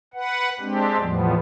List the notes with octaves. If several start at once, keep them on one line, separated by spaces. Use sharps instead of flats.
B4 F#5
G#3 C4 D4 G4
E2 A2 F3 G3 B3